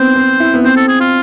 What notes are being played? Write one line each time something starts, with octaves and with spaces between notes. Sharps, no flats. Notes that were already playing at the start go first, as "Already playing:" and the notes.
Already playing: B3 C4 C5
C4
E4
B3
C4 C5
A4
G#4
F4